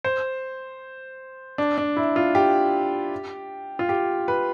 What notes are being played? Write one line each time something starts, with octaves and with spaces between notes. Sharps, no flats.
C5
D4
D4
E4
F4
G4
F4
G4
B4